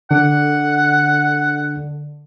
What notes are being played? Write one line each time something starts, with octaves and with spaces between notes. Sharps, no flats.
D3 D4 A4 F#5